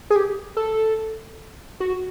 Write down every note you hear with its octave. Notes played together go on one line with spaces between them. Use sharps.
G#4
G4
A4
F#4